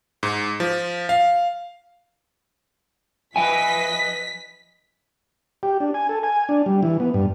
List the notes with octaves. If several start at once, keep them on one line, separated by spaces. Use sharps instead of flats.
G#2
F3
F5
F3 B4 D#5 E5 G#5 B6
G4
D4
G#5
A4
G#5
D4
G3
E3
B3
G2